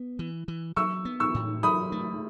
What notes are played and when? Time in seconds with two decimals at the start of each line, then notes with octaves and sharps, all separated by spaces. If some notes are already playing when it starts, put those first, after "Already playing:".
Already playing: B3
0.19 E3
0.48 E3
0.76 F#3 C#6 E6
1.05 B3
1.20 C#6 E6
1.34 A2
1.63 F#3 B5 D#6
1.92 A3